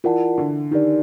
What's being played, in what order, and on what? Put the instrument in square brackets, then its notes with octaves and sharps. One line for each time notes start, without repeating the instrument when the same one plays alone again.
[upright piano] E3 [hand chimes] F4 A#4 D5 F#5 A5
[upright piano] D3
[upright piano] D#3 [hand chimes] D#4 G4 A#4 D5